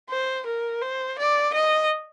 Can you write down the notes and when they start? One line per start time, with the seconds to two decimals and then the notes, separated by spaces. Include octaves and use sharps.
0.10 C5
0.46 A#4
0.81 C5
1.18 D5
1.54 D#5